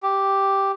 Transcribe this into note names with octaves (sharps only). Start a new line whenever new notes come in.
G4